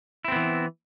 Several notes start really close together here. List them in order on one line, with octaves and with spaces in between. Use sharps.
E4 C4 B3 E3